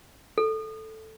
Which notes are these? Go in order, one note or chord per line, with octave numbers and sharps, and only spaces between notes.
A4